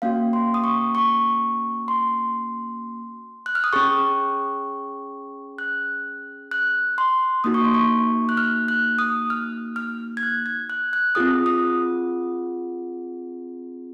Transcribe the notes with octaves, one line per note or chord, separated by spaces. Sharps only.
A#3 C#4 F#4 F5
C6
D#6
C#6
C#6
C6
F#6
F6
D#6
C#4 G#4 C#6
F#6
F#6
C6
A#3 D#4 F#4 D#6
C#6
C6
C#6
F#6
F6
F#6
D#6
F6
F6
G#6
F#6
G#6
F#6
F#6
C4 F4 G#4 D#6
D#6